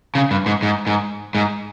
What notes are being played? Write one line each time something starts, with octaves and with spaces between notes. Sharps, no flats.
C#3
G2
G#2
G#2
G#2
G#2